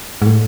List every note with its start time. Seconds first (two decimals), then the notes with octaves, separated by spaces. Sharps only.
0.22 G#2
0.26 A2